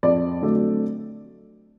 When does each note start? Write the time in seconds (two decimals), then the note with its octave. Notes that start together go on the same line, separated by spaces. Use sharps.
0.03 F2 D5
0.42 D3 F#3 A3 C4